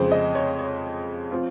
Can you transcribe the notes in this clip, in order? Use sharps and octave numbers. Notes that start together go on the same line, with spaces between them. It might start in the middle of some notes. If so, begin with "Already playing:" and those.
Already playing: F2 C#3 G#3 C5
D#5
C#5
C#5
F3 C4 F4